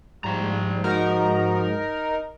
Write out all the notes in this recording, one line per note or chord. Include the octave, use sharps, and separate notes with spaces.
G#2 F3 G3 A#5
D#4 F#4 A#4